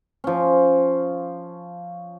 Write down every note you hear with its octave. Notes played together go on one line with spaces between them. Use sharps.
F3 C#4